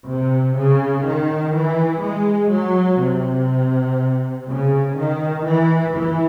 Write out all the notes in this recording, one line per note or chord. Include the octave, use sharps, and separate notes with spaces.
C3
C#3
D#3
E3
G#3
F#3
C3
C#3
D#3
E3
E3